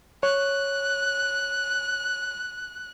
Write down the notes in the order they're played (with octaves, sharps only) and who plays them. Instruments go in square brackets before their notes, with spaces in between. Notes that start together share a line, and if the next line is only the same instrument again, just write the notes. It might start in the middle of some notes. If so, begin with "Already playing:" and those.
[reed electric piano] C#5 [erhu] F#6